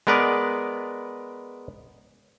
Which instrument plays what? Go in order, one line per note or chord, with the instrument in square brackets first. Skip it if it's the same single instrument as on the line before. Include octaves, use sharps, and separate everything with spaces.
[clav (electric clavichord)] G#3 B3 A#4 B4 D5